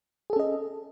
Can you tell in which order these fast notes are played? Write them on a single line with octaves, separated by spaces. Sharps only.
G#4 A4 C#4 D#5